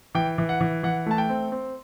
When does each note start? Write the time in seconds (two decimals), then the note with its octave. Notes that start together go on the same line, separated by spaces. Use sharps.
0.15 E3 G5
0.38 E3
0.49 F#5
0.61 E3
0.83 E3 F#5
1.06 A3 A5
1.18 G5
1.29 C4
1.52 C4